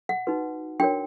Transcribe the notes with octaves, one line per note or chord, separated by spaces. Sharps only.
F#5
D#4 F#4 B4
D4 F#4 A#4 C#5 G5